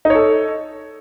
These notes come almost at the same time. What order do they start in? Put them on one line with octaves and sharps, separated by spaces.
D#4 C#5 A4